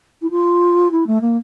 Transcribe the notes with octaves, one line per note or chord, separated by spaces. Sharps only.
E4
F4
E4
A3
A#3